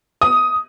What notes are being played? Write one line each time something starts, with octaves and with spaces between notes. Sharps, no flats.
D#6